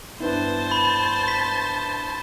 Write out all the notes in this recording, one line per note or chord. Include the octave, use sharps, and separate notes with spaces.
G2 B3 E4 C5 A5
B5
B6